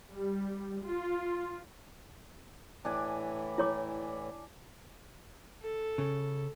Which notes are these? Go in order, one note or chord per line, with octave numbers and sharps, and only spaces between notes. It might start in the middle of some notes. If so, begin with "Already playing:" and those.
G3
F4
A2 E3 D4 G#5
E4 C#5 D6
A4
C#3